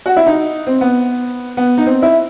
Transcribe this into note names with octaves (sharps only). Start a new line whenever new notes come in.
F#4
E4
D#4
C4
B3
B3
D#4
C4
E4